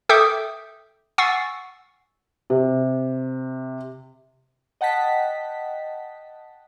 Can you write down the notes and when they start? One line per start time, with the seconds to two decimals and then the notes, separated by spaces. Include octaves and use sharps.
0.09 A4 E5 G5 D6 D#6 G6
1.18 F#5 G#5 C#6 E6 A6 C7
2.50 C3
4.81 D#5 F#5 G5 A5 B6